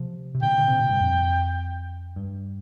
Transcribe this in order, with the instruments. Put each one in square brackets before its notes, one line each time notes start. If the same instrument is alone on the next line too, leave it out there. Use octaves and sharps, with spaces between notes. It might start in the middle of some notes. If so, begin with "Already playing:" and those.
Already playing: [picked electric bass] C3 F3
C3
[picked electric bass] A#2 D3 [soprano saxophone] G5
[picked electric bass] D3
C3
A#2
G2
F2
G2